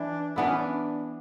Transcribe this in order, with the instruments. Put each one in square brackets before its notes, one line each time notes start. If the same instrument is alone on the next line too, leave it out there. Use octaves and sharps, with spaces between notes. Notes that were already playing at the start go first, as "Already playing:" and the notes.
Already playing: [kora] E3 E4 [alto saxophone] D4
[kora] E3 B3 E4 [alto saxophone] D4
[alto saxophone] C#4
D4